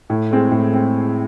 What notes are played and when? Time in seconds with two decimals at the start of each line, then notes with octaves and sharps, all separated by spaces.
0.10 A2
0.31 G#3 C4 G#4
0.51 A2
0.72 G#3 C4